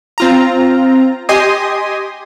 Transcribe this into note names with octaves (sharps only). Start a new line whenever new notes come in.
C4 F4 A#5
G4 D#5 G#5 C6 D#6